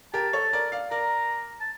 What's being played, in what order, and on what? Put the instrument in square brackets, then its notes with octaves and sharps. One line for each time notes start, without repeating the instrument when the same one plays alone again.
[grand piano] G4 A#4 [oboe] A5
[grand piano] A4 C#5
A#4 D5
D5 F5
[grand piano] A#4 D5 [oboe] A#5
[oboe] A5